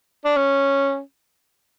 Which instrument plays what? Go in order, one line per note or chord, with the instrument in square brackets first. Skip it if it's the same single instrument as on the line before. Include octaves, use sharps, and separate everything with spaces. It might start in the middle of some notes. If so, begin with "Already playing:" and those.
[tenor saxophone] D4
C#4